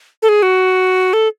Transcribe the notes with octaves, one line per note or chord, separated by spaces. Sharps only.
A4
G#4
F#4
A4